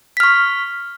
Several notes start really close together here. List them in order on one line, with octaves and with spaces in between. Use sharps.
B6 F6 C#6